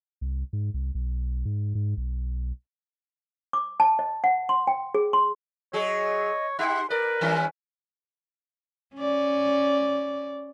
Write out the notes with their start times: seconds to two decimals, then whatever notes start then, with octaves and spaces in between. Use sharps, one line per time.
0.21 C2
0.53 G#2
0.74 C2
0.95 B1
1.45 G#2
1.75 G#2
1.97 B1
3.53 D6
3.80 A5
3.99 D#5
4.24 F#5
4.49 C6
4.67 G5
4.95 G#4
5.13 C6
5.73 F#3 G#4 C#5 D#5
6.59 D#4 G4 F#5 C6
6.90 A#4 B4 D5
7.21 D#3 G3 C#4
8.95 C#4 D5